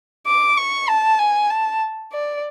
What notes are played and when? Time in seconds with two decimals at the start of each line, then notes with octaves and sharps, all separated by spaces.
0.27 D6
0.57 C#6
0.88 A5
1.19 G#5
1.50 A5
2.12 D5